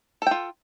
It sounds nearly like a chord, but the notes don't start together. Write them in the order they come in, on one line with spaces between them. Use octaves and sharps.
A4 G5 F4